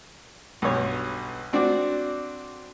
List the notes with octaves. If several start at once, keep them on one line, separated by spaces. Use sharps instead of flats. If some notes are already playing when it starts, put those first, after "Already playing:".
B1 G2 B2 C#5
C4 D4 F#4 D5